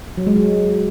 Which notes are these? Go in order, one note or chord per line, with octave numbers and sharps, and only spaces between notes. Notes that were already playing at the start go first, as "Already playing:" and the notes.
F#3
G#3
F#3